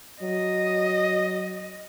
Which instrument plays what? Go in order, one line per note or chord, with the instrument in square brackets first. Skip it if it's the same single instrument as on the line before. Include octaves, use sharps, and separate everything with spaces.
[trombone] F#3 [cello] D#5